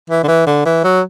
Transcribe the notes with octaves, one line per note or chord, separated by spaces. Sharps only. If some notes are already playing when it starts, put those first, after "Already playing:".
E3
D3
E3
D3
E3
F#3